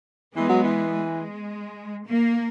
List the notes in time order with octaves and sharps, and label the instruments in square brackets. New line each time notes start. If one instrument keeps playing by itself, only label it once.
[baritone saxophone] E3 [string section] G#3 B3
[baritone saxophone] F#3
E3
[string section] G#3
A#3